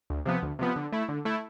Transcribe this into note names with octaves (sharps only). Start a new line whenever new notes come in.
D2
C3 F3 B3
D2
C3 F3 B3
D3
A3 E4
D3
A3 E4